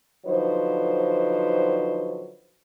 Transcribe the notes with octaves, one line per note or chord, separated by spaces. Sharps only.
D3 F3 F#3 D#4 B4 C5